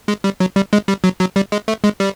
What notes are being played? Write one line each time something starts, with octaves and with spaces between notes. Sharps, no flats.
G#3
G3
F#3
G3
G#3
G3
F#3
F#3
G3
G#3
A3
G#3
G3